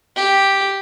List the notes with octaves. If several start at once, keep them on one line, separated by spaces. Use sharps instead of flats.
G4